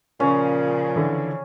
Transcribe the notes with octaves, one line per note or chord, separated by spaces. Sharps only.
A#2 C#3 F3 C#4
D3 E3